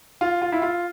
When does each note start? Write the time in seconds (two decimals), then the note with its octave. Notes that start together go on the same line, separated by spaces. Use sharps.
0.21 F4
0.42 F4
0.52 E4
0.62 F4